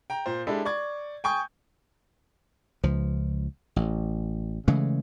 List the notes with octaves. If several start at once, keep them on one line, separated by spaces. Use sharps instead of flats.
G5 A#5
A#2 C5
G#3 D4 E4 G4 A4
D5 C#6 G#6
G5 G#5 C#6 D#6 G6
C#2 F3
A1
C#3 E3 G#3 A3